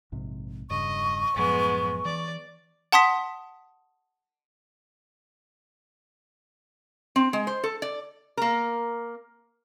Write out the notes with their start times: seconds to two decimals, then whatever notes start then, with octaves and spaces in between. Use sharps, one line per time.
0.12 A#1 G#2 C3
0.70 E1 G2 C#3 D#5 C#6
1.36 A1 F#2 F3 G#3 B3
2.05 E3 D5
2.92 F#5 A5 C6 D#6 B6
7.16 C4
7.33 G#3
7.47 C5
7.64 A4
7.82 D5
8.37 A#3 A#4